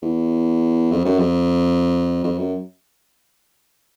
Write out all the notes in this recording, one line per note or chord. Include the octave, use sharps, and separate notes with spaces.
E2
F2
F#2
F2
F2
F#2